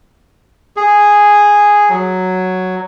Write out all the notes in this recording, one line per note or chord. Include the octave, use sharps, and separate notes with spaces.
G#4
F#3